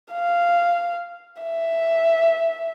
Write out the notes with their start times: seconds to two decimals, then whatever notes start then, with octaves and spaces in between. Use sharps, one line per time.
0.12 F5
1.42 E5